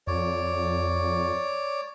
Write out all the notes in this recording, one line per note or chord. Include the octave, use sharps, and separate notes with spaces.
F2 C#5 D5